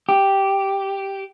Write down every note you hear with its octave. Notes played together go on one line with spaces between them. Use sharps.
G4